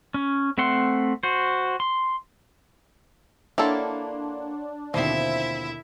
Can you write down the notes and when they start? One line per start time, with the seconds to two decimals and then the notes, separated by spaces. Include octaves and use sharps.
0.14 C#4
0.58 A3 C4 E5 F#5 C6
1.23 F#4 C5
1.80 C6
3.58 A#3 D4 E4 A4 C#5 F#5 C6
4.94 D#2 B2 D3 F3 C4 E4 E5